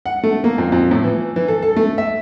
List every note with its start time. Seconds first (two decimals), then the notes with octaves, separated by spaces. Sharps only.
0.06 F#5
0.24 A3
0.44 A#3
0.58 F2
0.72 F2
0.91 A2
1.04 E3
1.36 E3
1.48 A4
1.62 A4
1.76 A3
1.98 E5